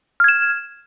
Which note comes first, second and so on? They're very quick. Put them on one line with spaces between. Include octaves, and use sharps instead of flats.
F6 G#6 E7